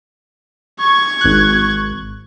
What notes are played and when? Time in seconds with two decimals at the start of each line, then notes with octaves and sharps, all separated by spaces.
0.79 C#6 G#6
1.21 G#1 F#6